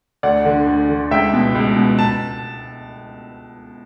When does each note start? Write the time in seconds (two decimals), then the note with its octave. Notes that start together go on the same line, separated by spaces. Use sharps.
0.23 D2 D5 F#5
0.45 D3
0.67 D2
0.89 D3
1.11 C#2 E5 G5
1.34 B2
1.55 C#2
1.77 B2
1.99 A5